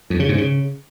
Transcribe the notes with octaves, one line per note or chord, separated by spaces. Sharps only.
F2
C#3
G#2
C#3